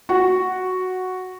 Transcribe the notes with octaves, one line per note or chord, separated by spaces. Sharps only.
F#4